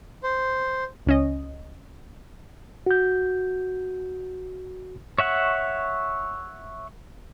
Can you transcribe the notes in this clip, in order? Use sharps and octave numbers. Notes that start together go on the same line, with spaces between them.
C5
C#2 C#4 D#5
F#4 G6
C#5 E5 F#5 C#6